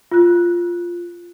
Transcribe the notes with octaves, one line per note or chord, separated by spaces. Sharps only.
F4 F#6